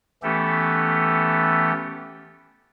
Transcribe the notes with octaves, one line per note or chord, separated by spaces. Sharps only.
E3 A3 B3 C#4 G4 A4